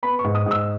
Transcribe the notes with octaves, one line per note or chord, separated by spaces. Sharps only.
B3 B5
C#6
G#2
D#6
G#2 E6